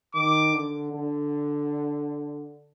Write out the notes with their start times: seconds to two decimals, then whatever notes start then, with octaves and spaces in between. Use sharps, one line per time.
0.15 D#3 D6
0.53 D3
0.92 D3